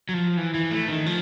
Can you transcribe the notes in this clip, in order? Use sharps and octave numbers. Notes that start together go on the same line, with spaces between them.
F#3
F3
E3
E3
A3
D#3
F3